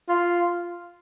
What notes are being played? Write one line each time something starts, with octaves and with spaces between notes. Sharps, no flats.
F4